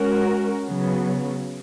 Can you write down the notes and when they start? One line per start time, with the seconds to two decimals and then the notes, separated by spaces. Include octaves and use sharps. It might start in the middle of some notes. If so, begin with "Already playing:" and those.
Already playing: G#3 C#4 F#4 A#4
0.66 C#3 F#3 B3